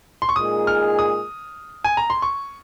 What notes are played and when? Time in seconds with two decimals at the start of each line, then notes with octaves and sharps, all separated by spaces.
0.22 C6
0.29 C#6
0.36 A#2 G#3 D#4 G#4 D#6
0.67 F6
0.99 D#6
1.84 G#5
1.97 A#5
2.10 C6
2.22 C#6